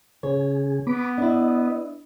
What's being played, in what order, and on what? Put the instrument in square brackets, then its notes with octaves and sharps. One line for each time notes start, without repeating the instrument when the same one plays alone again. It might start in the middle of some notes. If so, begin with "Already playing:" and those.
[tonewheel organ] C#3 G#4 [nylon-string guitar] C#5
[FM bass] B3 [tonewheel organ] B5 D6
[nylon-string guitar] D4 E4 [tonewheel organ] D#5